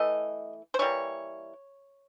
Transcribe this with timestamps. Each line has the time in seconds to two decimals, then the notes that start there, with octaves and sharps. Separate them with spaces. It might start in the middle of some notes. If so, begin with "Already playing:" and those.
Already playing: E3 A3 D#5
0.74 C5
0.79 E3 G3 A#3 C#5